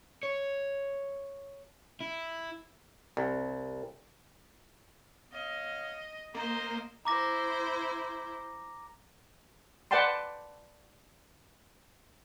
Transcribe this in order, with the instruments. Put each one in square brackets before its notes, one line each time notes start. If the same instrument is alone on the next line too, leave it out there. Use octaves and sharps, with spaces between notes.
[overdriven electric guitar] C#5
E4
[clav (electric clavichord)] C2
[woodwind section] B3 C#5 F5 [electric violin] D#5
[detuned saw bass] A#3 [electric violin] C5 D#5 [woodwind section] A#5
[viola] E4 C5 [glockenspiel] A#5 D6 A#6
[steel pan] B4 D5 F#5 G5 A5 C6